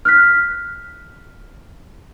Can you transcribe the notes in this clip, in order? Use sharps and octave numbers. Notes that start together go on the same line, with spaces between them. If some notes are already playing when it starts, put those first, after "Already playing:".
F6 F#6 B6